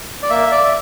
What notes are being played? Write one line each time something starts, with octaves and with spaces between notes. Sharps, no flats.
D5
A#3 E5
D5
E5